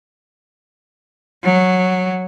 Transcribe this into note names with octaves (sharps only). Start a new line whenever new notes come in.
F#3